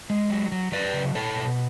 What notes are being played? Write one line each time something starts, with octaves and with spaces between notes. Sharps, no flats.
G#3
F#3
F#3
F#3 B4 D5
C#3
B2 A4 C#5
B2